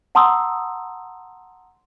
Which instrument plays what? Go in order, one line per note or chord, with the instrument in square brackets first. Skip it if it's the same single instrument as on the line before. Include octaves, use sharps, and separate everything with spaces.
[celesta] F#5 A5 A#5 C6 D#6 E6